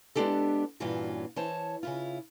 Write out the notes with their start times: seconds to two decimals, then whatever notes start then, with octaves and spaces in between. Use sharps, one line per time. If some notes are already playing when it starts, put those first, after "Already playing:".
0.15 G#3 B3 C4 D4 G4 A4
0.80 G2 A#2 E3 C#4 F4 F#4
1.36 E3 C5 C#5 A5
1.83 C#3 E4 F4